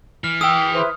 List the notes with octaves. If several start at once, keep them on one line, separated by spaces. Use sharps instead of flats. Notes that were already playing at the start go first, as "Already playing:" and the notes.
E3 F6
G#4 G5 D#6 E6
E4 B4 C5